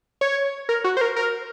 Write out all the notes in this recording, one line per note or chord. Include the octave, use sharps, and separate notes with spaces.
C#5
A#4
F#4
C5
A#4
A#4